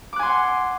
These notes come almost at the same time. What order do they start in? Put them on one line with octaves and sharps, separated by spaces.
D6 F#6 G#5 C6 F#5